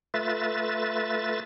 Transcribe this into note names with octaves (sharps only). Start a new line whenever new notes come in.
A3 F4 B4 E5 A6